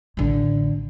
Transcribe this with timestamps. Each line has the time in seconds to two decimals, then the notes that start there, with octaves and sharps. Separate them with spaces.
0.17 A1 D3